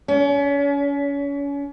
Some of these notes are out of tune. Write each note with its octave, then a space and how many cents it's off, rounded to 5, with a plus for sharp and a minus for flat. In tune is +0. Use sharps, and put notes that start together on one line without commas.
C#4 +35